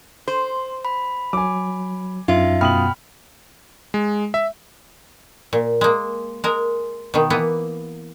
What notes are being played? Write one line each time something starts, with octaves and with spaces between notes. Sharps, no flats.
C5 C6
B5
F#3 G#5 D6
F#2 D#4 F4 E5
B2 G5 B5 D#6 F6 F#7
G#3
E5
A#2
G#3 A#3
G#3 A#4
B2 D#3
E3 A#3 B3